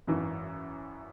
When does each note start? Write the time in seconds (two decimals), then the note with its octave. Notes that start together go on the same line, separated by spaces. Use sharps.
0.07 G#1 F#2 E3